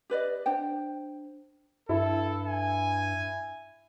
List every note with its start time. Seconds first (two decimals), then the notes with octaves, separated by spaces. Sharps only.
0.10 G4 B4 D5 D#5
0.46 D4 C5 G5
1.89 G2 E4 A4
2.46 G#5